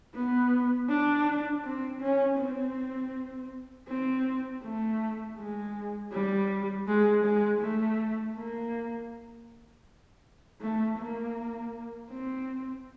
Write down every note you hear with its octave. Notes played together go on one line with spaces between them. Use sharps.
B3
D4
C4
C#4
C4
C4
A3
G#3
G3
G#3
G#3
A3
A#3
A3
A#3
C4